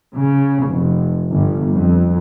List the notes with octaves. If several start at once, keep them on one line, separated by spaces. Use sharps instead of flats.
C#3
F1
G1
F2